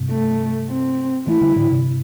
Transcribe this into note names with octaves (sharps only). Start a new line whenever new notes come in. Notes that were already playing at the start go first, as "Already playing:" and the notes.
Already playing: G2 C3
A3
C4
E3 A3 E4
D3 G3
A2 D3
G2 C3